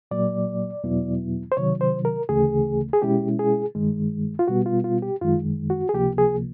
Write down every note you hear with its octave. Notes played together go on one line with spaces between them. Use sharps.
A#2 F#3 A#3 D5
E2 B2 F#3 B3 E4
C5
C3 D#3 F#3 C#5
C5
A#4
D2 C#3 E3 A3 G#4
G#4
B2 G#3 C#4 E4 G4
G#4
G2 D#3 G#3
F4
B2 G3 B3 F#4
F4
F4
G4
F#2 D#3 G#3 F4
F#4
G#4
C#2 C3 F3 A#3 G4
G#4